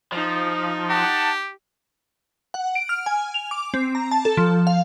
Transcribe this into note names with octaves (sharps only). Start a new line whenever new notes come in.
F3 D#4
G4 F#5 A5
F#5
D7
F6
G#5
F7
D6
C4
A#5
A5
A4
F3
F5